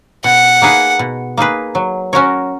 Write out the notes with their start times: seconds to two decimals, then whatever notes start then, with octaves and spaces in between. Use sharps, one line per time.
0.24 B2 F#5
0.62 A#3 D#4 G#4 B4
0.99 B2
1.38 A#3 D#4 G#4 B4
1.75 F#3
2.13 C#4 F#4 A#4 C#5